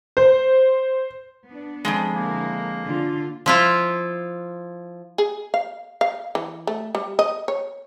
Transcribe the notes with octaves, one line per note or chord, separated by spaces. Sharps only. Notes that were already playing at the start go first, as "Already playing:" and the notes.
C5
B3 D4
F2 C#3 G#3
D3 A#3 E4 A#4
D3 D4 F4
F3 E4 F4
G#4
F5
F5
E3
A3
G3
D#5
C#5